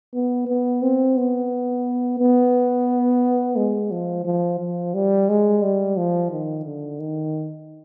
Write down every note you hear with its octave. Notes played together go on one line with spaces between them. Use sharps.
B3
B3
C4
B3
B3
G#3
F3
F3
F3
G3
G#3
G3
F3
D#3
D3
D#3